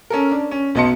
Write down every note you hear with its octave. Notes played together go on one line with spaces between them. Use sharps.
C#4 A4 A#4
D4
C#4
B1 B3 D#5 A5 C6 C#7